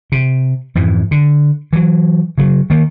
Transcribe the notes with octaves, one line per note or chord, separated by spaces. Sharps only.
C3
F2 G#2 E3
D3
E3 F#3
C#3 F#3
D#3 A#3